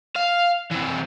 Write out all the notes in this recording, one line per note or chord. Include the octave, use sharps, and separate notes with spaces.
F5
E3 C4